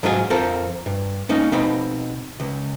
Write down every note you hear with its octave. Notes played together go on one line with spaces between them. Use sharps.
G#2 F#3 G#3 F4 G#4 G#5
F2 C4 F4 A4 A#4
G2
A#3 C#4 D#4
B2 C4 D#4 B5
C#2